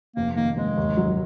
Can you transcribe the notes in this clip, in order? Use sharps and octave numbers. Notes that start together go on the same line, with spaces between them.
F1 A#3
D#3 A#3
F1 G#3
D#2
F#3